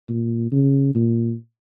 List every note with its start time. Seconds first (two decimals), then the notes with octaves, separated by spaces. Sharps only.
0.09 A#2
0.51 C#3
0.95 A#2